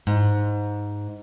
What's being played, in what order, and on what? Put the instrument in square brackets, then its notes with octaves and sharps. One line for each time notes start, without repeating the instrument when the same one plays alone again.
[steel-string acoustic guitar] G#2